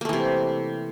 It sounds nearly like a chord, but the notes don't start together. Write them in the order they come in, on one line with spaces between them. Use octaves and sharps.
A#3 A3 E3 C3